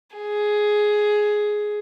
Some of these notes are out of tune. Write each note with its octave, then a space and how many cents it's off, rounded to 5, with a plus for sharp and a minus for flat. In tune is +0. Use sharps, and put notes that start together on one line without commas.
G#4 +10